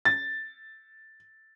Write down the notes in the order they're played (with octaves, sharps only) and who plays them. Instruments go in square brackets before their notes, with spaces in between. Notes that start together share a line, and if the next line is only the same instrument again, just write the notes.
[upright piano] A6